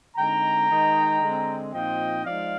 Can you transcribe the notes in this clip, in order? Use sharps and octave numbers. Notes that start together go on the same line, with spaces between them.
D3 G#3 C4 D#4 G5 A#5
D#3 G#3 D#4
D3 G#3 C4
A#2 F3 C4 D#4 D#5 G5
F3 G#3 D#4 D5 F5